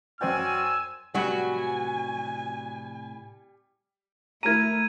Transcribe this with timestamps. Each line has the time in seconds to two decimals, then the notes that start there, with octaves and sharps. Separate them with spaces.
0.21 F#2 C#4 F#4 C5 D5 G5 G#5 E6
1.15 A2 C3 F#3 G3 F#4 B4 G#5
4.43 A3 E4 A#4 A#5 G#6 D#7